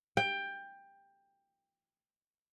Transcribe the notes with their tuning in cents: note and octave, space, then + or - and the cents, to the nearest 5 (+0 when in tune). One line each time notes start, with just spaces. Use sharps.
G5 +15